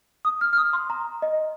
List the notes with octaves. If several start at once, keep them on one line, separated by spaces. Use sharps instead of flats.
D#6
F6
F6
D#6
C6
A#5
D#5